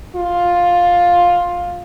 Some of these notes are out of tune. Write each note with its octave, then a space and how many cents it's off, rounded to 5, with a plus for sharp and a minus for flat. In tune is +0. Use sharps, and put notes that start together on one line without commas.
F4 +10